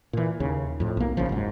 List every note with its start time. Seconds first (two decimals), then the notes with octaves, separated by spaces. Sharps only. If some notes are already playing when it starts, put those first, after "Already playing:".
0.13 A#2 E3
0.40 D#2 C#3
0.80 F2 A2
0.97 B1 A#3
1.17 A#1 C#3 F3
1.29 F#1 G#2